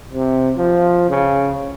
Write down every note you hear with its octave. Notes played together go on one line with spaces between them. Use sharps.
C3
F3
C#3